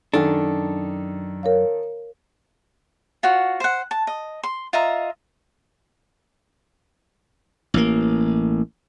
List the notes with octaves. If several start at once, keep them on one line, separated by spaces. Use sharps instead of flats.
F#2 D#3 D4 A4
A#4 C#5 F5
F4 F#4 C#5 F#5
C5 F#5
A5
D#5
C6
F4 D#5 E5 A#5
A1 A#3